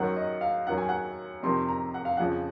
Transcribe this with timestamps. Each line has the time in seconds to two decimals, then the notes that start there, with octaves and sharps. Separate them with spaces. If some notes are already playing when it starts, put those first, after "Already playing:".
Already playing: F#2 D#3 F#3 F#5
0.17 D#5
0.41 F5
0.67 F#2 D#3 F#3 F#5
0.78 G#5
0.89 F#5
1.43 F2 C3 D#3 C6
1.68 A#5
1.94 F#5
2.05 F5
2.17 F2 C#3 F3 F#5